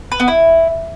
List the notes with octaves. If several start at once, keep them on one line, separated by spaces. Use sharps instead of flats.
B4
B3
E4